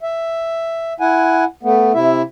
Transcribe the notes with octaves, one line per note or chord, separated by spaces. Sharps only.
E5
E4 F#5 G#5
A3 B3
C3 E4 E5